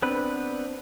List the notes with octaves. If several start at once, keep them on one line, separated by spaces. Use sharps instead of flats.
B3 C4 D4 B4